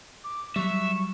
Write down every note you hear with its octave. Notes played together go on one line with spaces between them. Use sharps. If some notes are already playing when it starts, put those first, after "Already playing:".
D6
F#3 G3 E5 C#6